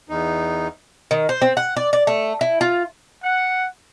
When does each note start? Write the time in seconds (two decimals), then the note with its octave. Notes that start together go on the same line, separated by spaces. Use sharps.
0.09 E2 D#4
1.11 D#3
1.29 C5
1.42 C4
1.57 F#5
1.77 D5
1.93 D5
2.07 A3
2.41 E4
2.61 F4
3.22 F#5